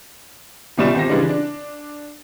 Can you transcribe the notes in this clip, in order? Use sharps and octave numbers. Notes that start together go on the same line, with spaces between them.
G1 C#2 B2 G3 B4 E7
G#1 G4 A#6
C#3 E3 G3 G#3 D4
D4